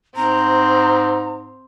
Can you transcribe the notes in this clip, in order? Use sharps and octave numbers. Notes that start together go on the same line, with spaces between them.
G#2 C4 A#5